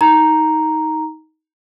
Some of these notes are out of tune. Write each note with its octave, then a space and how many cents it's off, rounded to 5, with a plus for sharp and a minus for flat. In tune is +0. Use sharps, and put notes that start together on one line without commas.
D#4 +20 A#5 +0